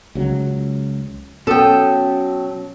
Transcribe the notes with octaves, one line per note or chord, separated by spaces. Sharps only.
C#2 C#3 F#3
B2 F#3 C#4 A4 G5 D#6